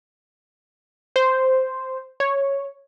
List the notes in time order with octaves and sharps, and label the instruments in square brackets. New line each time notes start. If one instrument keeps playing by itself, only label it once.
[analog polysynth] C5
C#5